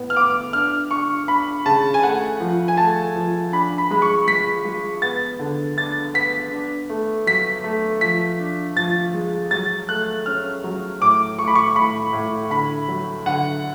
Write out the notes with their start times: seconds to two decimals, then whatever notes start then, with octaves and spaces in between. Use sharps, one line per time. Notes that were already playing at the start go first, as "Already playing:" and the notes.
Already playing: A2 B3
0.10 F6
0.16 B3 D6
0.53 D4 F6
0.91 D4 C#6
1.28 D4 B5
1.66 C#3 A5
1.94 G#5
2.03 A3 F#5
2.40 F3
2.68 G#5
2.77 A3 A5
3.16 F3
3.52 D4 B5
3.78 B5
3.91 G#3 B5
4.02 C#6
4.27 G#3 B6
4.65 G#3
5.02 B3 A6
5.39 D3
5.77 D4 A6
6.14 B3 B6
6.52 D4
6.90 A3
7.27 F#3 B6
7.64 A3
8.01 F3 B6
8.39 D4
8.76 F3 A6
9.14 G#3
9.51 F#3 A6
9.89 A3 F#6
10.26 C#4 F6
10.64 F#3
11.01 A2 D6
11.38 A2 C#6
11.48 B5
11.55 C#6
11.76 A2 B5
12.13 A2
12.50 D3 B5
12.88 F#3
13.26 D3 F#5